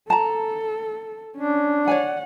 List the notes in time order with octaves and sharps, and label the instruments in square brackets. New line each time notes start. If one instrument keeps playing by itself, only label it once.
[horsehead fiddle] A4 [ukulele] A5 A#5
[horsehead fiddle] C#4 [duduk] D4
[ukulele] C#5 D5 G#5 [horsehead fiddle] F#5